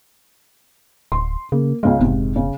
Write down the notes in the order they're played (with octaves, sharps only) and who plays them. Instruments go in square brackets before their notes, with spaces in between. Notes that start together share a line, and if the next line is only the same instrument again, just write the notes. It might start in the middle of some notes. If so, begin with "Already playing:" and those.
[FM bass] D1 [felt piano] C6
[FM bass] C#3 [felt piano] A#3
[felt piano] C#2 C#3 F5 [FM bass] G#3
[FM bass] F1 [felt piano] G#2 C3
[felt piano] C#3